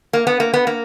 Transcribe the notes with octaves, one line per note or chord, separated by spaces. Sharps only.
A#3
B3
A#3
B3
A#3